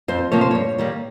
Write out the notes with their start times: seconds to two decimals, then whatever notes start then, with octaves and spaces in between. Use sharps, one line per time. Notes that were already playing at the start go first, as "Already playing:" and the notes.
0.08 F2 C5
0.32 C3 F3 A#3 C#5
0.41 C5
0.51 G2 C#5
0.78 D#3 G3 A#3